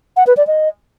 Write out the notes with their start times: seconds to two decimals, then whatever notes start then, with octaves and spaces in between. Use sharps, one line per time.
0.17 F#5
0.27 B4
0.37 D5
0.47 D#5